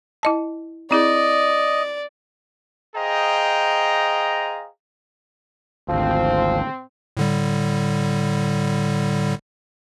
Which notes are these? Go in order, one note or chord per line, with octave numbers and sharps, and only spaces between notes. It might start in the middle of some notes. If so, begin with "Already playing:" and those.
E4 D#5 A5
C4 E4 G#4 D5 D#5
G#4 C5 D#5 F5 G5 A#5
G#1 D2 F3 C4
A2 D3 G3